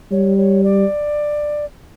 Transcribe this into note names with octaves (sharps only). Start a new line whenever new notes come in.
G3 C#5
C#5
D5